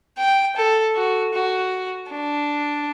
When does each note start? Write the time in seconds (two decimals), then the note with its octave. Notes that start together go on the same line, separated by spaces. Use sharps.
0.18 G5
0.56 A4
0.95 F#4
1.34 F#4
2.11 D4